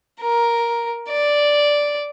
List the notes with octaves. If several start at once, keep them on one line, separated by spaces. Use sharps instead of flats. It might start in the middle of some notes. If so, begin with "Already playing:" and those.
A#4
D5